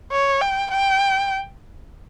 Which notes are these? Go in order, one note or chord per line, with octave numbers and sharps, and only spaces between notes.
C#5
G5
G5